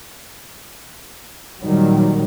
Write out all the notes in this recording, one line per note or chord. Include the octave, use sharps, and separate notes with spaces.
A#2 D#3 F#3 G3